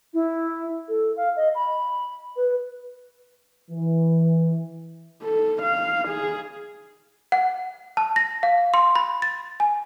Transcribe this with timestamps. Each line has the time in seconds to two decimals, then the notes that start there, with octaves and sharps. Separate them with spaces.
0.13 E4
0.88 A4
1.16 F5
1.36 D#5
1.54 B5
2.36 B4
3.71 E3
5.22 A4
5.62 F5
6.08 G#4
7.32 F#5
7.97 A5
8.16 A#6
8.43 F5
8.74 C6
8.96 B5
9.22 A6
9.60 G#5